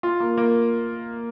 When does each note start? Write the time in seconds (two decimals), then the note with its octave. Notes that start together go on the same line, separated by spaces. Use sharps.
0.03 F4
0.20 A#3
0.37 A#3